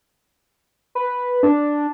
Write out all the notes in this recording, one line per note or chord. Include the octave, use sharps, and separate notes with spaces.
B4
D4